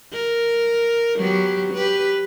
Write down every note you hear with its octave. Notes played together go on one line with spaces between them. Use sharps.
A#4
F#3 B3 G4
G4 B4